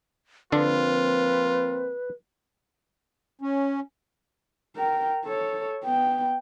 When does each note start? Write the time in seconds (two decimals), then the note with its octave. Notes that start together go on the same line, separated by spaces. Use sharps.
0.52 D3 F3 A#3 C4 D4 F4 B4
3.41 C#4
4.76 A#4 G5
5.25 A4 C#5
5.84 B3 G5